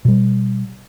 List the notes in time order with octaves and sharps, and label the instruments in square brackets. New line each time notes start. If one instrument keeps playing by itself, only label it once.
[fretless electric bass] B2 G3